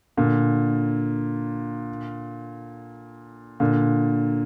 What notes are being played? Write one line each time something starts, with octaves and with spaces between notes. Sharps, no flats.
A#2 D3
A#2 D3